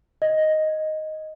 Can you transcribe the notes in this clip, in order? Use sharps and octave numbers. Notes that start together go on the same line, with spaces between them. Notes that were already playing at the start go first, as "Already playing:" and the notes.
D#5